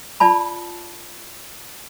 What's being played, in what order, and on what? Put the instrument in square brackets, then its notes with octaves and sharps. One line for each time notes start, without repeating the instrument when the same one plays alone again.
[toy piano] F4 D5 A5 B5